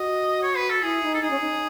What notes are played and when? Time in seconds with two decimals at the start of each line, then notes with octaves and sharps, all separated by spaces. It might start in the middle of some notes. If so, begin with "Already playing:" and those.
Already playing: F#4 D#5
0.43 C#5
0.57 B4
0.70 A4
0.82 E4 G#4
1.03 D#4
1.14 A4
1.22 D#4 G#4
1.31 C#4
1.40 D#4